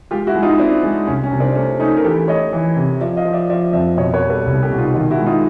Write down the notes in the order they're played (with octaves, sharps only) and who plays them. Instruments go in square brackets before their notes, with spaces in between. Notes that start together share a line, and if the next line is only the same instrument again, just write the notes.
[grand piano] G#3 [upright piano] F4 G4
[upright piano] E4 F#4
[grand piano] G#3
[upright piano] D#4 F4
[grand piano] C4 [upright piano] D4 E4
[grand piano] G#3
[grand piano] C2 [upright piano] C#4
[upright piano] C#4
[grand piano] C3
[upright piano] C4 D4
[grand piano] A3 [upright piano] C#4
[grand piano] A3 [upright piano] C#4 D#4
[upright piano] A#4
[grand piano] E3 [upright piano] G4 A4
[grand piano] A3 [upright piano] C#5 D#5
[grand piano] E3
C3
[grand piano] F3 [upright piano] D5 E5
[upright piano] D#5 F5
[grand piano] F3
[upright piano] D5 E5
[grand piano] F3 [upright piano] D5 E5
[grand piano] F2 [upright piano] D5 E5
[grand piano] B2 [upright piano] C#5 D#5
[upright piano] B4 C#5
[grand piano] G3
[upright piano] A4 B4
[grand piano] C2
[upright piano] G4 A4
[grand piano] B2 [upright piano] F#4
[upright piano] D#4 F4
[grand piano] D#3 [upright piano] D#4 F4
[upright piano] E4 F#4
[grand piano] G#3
[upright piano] D#4 F4